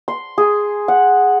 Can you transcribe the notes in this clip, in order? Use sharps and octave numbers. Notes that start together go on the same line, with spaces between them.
C6
G#4
F#5